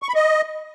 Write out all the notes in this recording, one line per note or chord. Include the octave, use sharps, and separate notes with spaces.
C#6
B5
D#5